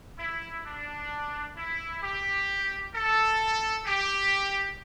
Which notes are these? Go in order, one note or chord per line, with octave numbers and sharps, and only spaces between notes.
E4
D4
E4
G4
A4
G4